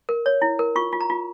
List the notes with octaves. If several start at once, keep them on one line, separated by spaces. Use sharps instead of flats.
A#4
C#5
E4
A#4
F4 C#6
F4
A#5
F4